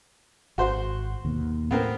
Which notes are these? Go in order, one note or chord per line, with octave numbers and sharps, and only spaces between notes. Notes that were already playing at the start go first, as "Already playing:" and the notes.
G#1 F#4 C5 C6
D#2 B2
A2 B3 C4 A#4